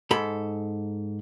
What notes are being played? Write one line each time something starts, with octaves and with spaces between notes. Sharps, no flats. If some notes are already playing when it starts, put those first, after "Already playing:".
G#2 A4 B5